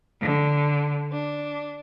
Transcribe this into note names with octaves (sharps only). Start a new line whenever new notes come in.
D3
D4